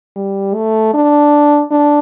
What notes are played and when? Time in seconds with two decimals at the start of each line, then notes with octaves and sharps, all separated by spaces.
0.16 G3
0.55 A3
0.94 D4
1.71 D4